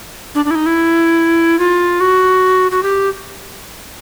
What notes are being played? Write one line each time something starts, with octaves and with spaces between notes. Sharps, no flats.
D4
D4
E4
D#4
E4
F4
F#4
F#4
G4